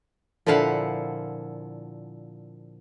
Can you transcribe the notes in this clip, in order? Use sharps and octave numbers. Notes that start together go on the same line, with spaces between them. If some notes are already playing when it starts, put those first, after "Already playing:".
A#2 D3 F3 E4 F5 F#5